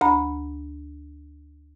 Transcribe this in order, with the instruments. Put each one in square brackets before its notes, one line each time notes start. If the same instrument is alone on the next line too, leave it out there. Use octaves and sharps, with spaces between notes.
[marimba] D2 A#5 B5